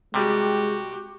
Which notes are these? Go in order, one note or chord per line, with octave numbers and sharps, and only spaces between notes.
C3 G3 G#3 F#4 G4